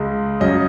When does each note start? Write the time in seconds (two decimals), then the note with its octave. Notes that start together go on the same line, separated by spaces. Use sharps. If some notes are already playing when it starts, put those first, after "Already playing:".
Already playing: C#2 C#3 G#3
0.40 F#2 C#3 F#3 C#4 D#5